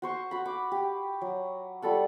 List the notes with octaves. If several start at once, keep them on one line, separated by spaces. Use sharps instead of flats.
F#4 C5 C#6
F#4 B5
D6
G4
F#3
G3 F4 A4 F#5